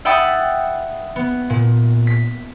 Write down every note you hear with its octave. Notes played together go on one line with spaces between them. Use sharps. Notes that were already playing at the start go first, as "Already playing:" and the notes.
E5 F#5 G5 B5 D#6 A6
B3
A#2
B6